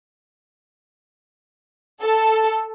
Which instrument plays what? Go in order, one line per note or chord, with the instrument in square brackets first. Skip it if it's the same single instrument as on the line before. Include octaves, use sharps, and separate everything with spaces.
[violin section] A4